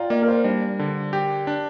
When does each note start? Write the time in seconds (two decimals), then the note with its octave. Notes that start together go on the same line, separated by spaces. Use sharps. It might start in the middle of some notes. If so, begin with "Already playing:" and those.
Already playing: F4 D5 F5 G5 A#5
0.10 A#3 D5
0.22 A#4
0.28 C5
0.44 G3 D4
0.79 D3
1.13 G4
1.47 D4